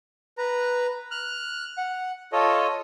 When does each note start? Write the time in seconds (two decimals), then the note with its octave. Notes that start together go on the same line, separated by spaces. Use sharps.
0.38 B4 A#5
1.11 F6 F#6
1.78 F#5
2.33 F4 A4 C#5 D#5